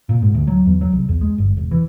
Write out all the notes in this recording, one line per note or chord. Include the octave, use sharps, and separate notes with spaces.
A#2
G#2
D2
F#3
E2
F#3
C2
E2
G#3
G1
E1
E3